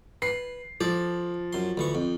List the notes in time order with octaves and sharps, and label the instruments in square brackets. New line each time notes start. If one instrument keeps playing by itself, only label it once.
[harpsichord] B4 [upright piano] C7
[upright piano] F3 [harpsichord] A4 D5
[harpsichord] F#2 C6
D2 E3 C#6
F2